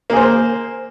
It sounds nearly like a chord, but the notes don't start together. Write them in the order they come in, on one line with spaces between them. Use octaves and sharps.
A#3 G#4 C5